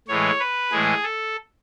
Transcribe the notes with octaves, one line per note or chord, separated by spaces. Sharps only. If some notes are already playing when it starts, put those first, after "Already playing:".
A2 E3 G#3 C#5
B4
A2 E3 G#3 G#4
A4